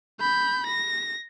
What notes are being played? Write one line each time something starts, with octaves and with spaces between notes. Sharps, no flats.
B5 G6
A#6